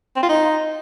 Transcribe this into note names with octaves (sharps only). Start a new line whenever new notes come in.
C4
F4
D#4